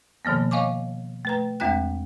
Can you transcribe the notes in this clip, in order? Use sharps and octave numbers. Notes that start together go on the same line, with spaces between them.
B2 D#3 F3 A#3 B3
C#5 D#5 F5 G#5 C#6 D6
A3 B4 A#5
E2 G#3 C4 F4 G5 F#6